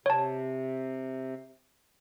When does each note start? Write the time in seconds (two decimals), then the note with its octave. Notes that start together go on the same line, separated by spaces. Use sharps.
0.06 C3 C#5 A5